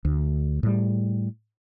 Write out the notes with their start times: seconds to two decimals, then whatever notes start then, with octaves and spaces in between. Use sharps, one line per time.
0.05 D2
0.63 A2 G3